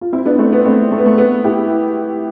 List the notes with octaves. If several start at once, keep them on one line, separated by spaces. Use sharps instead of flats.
F4
C4 E4
B3 D4
A3 C4
B3
A3 C4
A3
B3
A3
B3
E4 G4